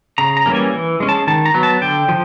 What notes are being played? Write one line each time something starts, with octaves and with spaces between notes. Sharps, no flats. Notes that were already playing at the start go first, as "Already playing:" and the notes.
C#3 A#5
A#5
E3 G3 A#3 C#4
G#5
E3
G#3 C#4
A5
D#3 A5
A#5
F#3 B3
A5
D3 G5
F3